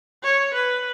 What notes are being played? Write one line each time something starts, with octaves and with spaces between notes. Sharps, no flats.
C#5
B4